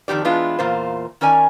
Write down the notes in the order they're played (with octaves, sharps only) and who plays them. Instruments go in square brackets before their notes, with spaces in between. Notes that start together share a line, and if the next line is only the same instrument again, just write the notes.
[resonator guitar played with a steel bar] F2 D#3 F3 G4 D5
E3 G#3 B3 D4 F4
E2 A#2 A#3 F4 C5
D#3 C#4 A#4 D5 G#5